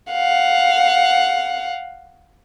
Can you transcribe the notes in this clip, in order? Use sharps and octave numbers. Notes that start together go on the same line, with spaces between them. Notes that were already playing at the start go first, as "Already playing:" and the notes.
F5 F#5